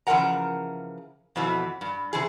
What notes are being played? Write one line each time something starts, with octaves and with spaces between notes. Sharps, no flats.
C#3 E3 F3 A#4 F#5 A#5
F2 B2 E3
G2
C3 E3 G#4